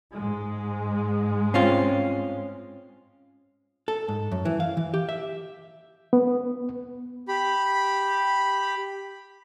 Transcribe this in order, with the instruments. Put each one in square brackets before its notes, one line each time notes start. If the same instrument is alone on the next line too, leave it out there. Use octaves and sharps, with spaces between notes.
[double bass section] G#2 G#3
[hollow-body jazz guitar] C4 C#4 F4
A4
G#2
F#2
E3
F5
E3
G4
E5
[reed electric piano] B3
[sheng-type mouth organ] G4 B5